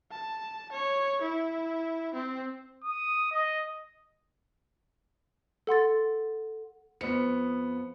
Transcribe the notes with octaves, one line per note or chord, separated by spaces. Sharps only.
A5
C#5
E4
C4
D#6
D#5
A4 F#5 C6 A6
F2 B3 C#7